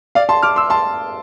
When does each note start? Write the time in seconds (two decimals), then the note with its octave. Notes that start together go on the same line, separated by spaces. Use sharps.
0.15 D5 F5
0.29 A5 C6
0.43 D6 F6
0.56 C6 E6
0.70 A5 C6